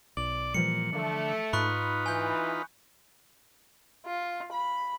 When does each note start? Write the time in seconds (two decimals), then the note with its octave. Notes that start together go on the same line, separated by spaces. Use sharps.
0.17 B1 D5 D6 F#7
0.54 A#2 E3 F3 G3 C#7
0.93 D3 A3
1.53 G#2 D#4 F4 B4 B5 C#6 F#6
2.06 E3 G#5 G6
4.06 F4
4.52 B5